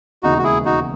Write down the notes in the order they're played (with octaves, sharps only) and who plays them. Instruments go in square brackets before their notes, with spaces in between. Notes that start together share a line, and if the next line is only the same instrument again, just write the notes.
[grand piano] E1 D#2 C#3 E3 G#3 [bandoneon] D#4 F#4
[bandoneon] F#4
E4 G#4
D#4 F#4